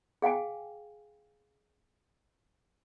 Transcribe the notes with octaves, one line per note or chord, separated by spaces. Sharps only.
G#4 F5 G5 G#5